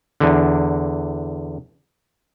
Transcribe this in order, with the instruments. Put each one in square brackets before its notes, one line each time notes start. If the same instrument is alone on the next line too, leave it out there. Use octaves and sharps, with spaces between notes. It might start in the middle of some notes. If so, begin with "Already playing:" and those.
[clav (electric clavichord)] E2 D3